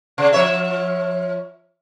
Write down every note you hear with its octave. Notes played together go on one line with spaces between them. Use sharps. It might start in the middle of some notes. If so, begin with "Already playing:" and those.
C#3
F3 C#5 E5